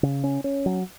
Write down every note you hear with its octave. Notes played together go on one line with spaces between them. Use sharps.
C#3
C#4
C#4
F#3